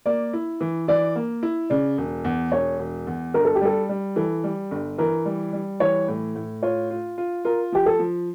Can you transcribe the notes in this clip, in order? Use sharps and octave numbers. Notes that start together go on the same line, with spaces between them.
A#3 D5
E4
E3
E3 D5
A#3
E4
C#3 D5
E1
E2
E1 C#5
E1
E2
G1 A#4
A4
G4
G3 A4
G3
E3 A4
G3
G1
E3 A#4
G3
G3
E3 C#5
A2
A2
F4 C#5
F4
F4
F4 A#4
F3 G4
A4
F3